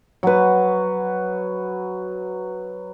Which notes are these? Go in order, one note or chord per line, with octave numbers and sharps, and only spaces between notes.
F#3 B4